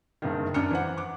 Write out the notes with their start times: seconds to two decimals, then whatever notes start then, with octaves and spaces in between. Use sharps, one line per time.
0.22 F#1 G2 D#3
0.54 F#2 D4 F6 C#7
0.71 E3 C5 F#5
0.97 D6